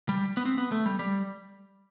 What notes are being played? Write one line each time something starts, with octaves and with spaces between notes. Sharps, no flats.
G3
B3
C4
B3
A3
G3
G3